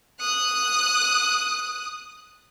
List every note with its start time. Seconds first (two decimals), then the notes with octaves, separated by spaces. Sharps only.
0.19 D#6 F#6